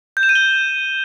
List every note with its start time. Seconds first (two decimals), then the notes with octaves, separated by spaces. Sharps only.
0.17 G6
0.23 E7
0.29 D#7
0.35 G7